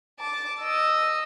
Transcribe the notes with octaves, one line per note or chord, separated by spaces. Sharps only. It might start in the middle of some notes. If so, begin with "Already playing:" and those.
A5 D6
D#5 E6